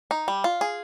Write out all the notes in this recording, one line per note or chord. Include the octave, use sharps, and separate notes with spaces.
D#4
G3
F4
G#4